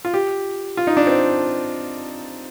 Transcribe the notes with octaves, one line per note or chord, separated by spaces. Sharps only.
F4
G4
F4
D#4
D4
C4